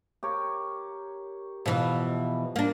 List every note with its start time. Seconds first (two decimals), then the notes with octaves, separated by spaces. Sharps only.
0.23 G4 A#4 C#5
1.66 B2 E3 F3 B3
2.56 A#3 D4